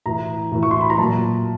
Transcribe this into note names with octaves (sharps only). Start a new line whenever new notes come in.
A2 E3 A#5
A2 E3
C#6
C6
B5
A#5
A#2 F#3 A5